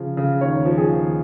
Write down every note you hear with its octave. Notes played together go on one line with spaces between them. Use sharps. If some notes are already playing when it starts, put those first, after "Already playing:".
Already playing: C#3 F3
C#3
D#2 C#5
F3
G#4
D#2